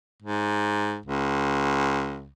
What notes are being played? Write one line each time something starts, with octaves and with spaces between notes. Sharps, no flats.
G#2
C#2